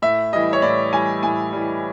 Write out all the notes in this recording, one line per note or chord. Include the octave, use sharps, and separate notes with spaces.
A2 E5
E3 G3 D#5
C#5
A2 D5
E3 G3 G#5
A2 G#5
E3 G3